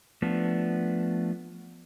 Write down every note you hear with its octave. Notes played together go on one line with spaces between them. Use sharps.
F3 A3 B3 D4